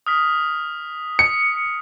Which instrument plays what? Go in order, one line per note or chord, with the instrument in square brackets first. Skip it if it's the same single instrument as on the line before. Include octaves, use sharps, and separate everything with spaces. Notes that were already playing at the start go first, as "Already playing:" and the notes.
[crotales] D#6 F6 B6
[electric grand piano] C#7